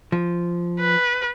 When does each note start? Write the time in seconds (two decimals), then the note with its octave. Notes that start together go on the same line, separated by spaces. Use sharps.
0.12 F3
0.80 B4